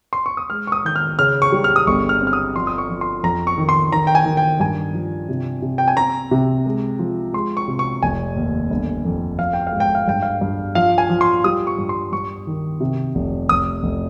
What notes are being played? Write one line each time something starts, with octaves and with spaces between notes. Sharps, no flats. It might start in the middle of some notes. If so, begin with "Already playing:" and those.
C6
C#6
D#6
G#3 F6
C#6
D#6
D#3 G6
F6
C#3 F6
C#6
G3
F6
D#6
G1 C#6
F6
C4
F6
D#6
F3 C6
D#6
C#6
F3
C6
F2 A#5
C#6
D#3
C6
D#3 A#5
G5
G#5
D#3
G5
G2 G#5
F3
C3
C3
G5
G#5
C4 A#5
C3
G#3
F3
G#3 C6
C#6
C3
C#6
F1 G#5
D#2
G1
F2
F3 F5
G5
F5
G#2
G5
F5
G2 G5
F5
G2
F3 F5
G#5
F3
C6
G3 D#6
C#6
G2
C6
G2 C#6
D#3
C3
F1
F1 D#6
F1